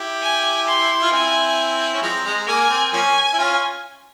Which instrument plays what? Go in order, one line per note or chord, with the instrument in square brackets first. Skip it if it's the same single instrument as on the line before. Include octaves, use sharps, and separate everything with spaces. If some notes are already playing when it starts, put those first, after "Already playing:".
Already playing: [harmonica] E4 G4
[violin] G#5
C6
[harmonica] F4
[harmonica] C4 E4 [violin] G#5
[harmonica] C#4
[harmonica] F3 G#3 C4 [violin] A#5
[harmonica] G#3
[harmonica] A#3 [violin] G#5
[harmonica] C4
[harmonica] F3 A#3 C#4 [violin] G#5
[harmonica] E4
C#4 F4